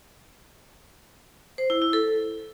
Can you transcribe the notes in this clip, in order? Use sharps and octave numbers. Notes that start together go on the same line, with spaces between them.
C5
E4
E4
A4